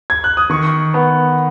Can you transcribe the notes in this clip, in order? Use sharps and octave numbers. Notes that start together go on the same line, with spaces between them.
G#6
F#6
D#6
D#3 C#6
B3